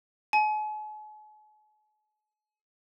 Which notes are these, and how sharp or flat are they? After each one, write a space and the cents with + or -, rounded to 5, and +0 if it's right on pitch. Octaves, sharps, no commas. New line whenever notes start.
G#5 +45